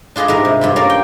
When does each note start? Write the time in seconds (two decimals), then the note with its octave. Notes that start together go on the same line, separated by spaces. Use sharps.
0.16 D4 F4 G#4 B4 D#5
0.28 G#2 G3 A#4
0.45 C3
0.61 G2 F4 B5
0.76 A#3 C#4 A#4 D5
0.90 G5